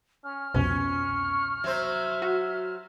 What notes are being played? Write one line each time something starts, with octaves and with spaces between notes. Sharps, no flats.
C#4 F6
C2 F2 B2 C#4 C#6
F#3 C5 E5
F#4